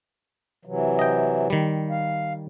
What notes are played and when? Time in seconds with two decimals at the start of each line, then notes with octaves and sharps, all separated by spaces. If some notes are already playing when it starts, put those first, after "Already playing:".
0.65 C3 E3 F#3
0.99 D#5 G5
1.50 D#3 G3
1.90 F5